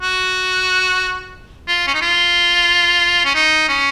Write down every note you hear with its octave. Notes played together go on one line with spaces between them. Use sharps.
F#4
F4
C#4
D#4
F4
C#4
D#4
C#4